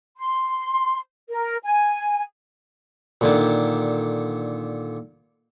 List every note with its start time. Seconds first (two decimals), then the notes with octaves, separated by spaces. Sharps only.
0.18 C6
1.29 A#4
1.64 G#5
3.21 A#2 D3 D#3